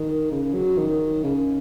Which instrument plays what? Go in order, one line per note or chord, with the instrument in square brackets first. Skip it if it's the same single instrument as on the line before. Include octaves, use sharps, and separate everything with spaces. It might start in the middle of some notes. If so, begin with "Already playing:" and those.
Already playing: [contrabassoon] D#3
C#3
F#3
D#3
C#3